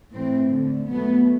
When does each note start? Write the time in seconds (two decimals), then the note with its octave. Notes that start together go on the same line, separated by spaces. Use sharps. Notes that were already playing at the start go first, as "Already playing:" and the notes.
0.14 A2 E3 A3 C4
0.51 D3 A3
0.89 B2 F#3 A3 B3